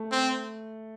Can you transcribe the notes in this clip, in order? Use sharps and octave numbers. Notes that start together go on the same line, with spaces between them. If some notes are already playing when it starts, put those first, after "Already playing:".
Already playing: A3
C4